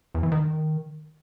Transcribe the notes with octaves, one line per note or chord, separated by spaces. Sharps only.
E2
E3
D#3